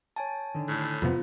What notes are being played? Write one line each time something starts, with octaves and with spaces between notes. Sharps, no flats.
C#5 G#5 A5
D3 D#3
A2
F2 C3 B3 F4 C5 A#5